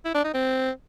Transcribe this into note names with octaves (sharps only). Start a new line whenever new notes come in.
E4
D4
D#4
C4